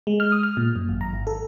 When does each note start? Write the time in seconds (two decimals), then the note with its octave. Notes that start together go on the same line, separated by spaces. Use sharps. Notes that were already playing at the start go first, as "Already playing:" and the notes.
0.07 G#3
0.20 F6
0.32 D#6
0.43 F6
0.57 A#2
0.76 F#2
0.89 G#1
1.01 A#5
1.13 G#1
1.27 A4